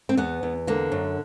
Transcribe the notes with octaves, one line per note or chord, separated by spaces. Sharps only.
C4
E2 B3
E2
D3 A#3
F#2